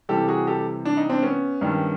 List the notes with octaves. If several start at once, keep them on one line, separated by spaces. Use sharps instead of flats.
C3 E3 G3 G4 A4
F#4 G#4
G4 A4
D4
D#4
C4 D4
B3 C#4
G2 D#3 G3